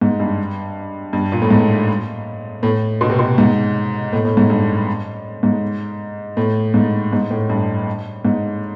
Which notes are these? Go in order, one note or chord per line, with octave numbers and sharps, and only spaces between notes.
G#2
G2
G2
A#2
A2
G#2
A2
B2
C3
B2
G#2
A2
A2
G#2
G2
G#2
A2
G#2
G#2
A2
G2
G#2